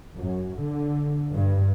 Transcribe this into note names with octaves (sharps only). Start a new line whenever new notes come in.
F#2
D3
G2